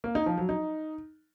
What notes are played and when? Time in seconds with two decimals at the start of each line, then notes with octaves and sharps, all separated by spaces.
0.04 A#3
0.15 D#4
0.26 F3
0.38 F#3
0.49 D#4